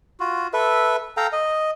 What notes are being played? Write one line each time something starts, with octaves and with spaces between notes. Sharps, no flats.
F4 F#4
A4 B4 E5
A4 F5 G5 A#5
D#5